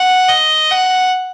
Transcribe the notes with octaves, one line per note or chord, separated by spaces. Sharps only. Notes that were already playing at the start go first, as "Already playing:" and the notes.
Already playing: F#5
D#5
F#5